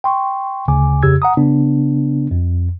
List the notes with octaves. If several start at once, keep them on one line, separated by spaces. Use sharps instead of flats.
G5 C6 C#6
D2 C#3 G#5 D6
F2 C#3 G4 E6 G#6
F#5 A#5 D#6
C#3 B3 D4
F2